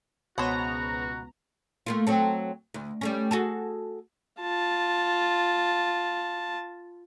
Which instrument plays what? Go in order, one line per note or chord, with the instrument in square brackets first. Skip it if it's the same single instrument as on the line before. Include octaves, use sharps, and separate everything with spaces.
[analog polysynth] C#2 B3 A#5 [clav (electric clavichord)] B2 [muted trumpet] F#4 [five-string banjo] C5 C#5 F#5
[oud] A3 A#3 F4
F#3 C4 A4
D2
G3 A3 C#4
F#4 G#4 A4
[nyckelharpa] F4 A5